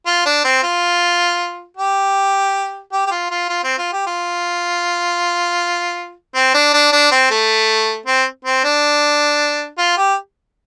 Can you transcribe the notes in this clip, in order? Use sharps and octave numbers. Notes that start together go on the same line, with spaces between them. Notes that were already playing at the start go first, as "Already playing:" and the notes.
F4
D4
C4
F4
G4
G4
G4
F4
F4
F4
C4
F4
G4
F4
C4
D4
D4
D4
C4
A3
C4
C4
D4
F4
G4